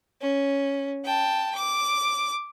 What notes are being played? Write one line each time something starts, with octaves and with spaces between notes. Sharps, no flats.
C#4
G5 A5
D6